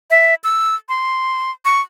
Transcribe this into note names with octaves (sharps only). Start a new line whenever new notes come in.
E5
E6
C6
C#6